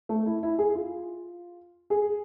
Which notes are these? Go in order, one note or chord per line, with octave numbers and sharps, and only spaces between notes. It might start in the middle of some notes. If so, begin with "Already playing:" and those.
A3
E4
E4
G#4
F4
G#4